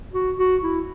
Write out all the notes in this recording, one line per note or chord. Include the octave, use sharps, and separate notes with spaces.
F#4
F#4
E4